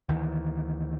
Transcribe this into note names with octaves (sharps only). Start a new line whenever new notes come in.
D2 D#3 E3